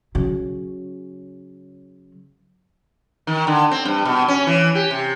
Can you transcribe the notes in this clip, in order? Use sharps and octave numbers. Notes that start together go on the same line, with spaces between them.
C#3 F#3
D#3
D3
C4
G2
B2
C#4
E3
G4
C3